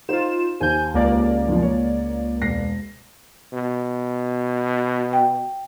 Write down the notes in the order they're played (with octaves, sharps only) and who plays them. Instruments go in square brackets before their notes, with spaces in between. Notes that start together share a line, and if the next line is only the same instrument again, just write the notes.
[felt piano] D#4 C5 [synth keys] F4 E7
[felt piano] D#2 C5 [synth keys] G#5 G6
[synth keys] C#2 A#3 D5
[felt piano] F#2 B2 F3
C#5
E1 A#6 C7
[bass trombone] B2
[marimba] G5